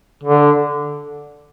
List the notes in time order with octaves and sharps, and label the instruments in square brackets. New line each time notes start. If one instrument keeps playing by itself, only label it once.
[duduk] D3